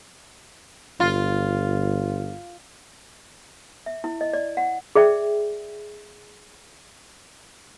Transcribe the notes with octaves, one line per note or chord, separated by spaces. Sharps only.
G1 F4
E5
E4
D#5
D5
F#5
G#4 D5 E5 G5